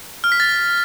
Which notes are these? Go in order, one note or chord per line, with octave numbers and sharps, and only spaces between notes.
F6
B6
A6